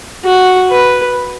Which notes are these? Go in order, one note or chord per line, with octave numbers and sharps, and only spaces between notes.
F#4
B4